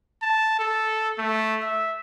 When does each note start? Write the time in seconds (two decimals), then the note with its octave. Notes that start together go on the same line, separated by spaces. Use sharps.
0.22 A5
0.59 A4
1.18 A3
1.62 E5